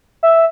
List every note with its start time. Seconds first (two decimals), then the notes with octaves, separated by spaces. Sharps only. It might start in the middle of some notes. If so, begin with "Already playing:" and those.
0.23 E5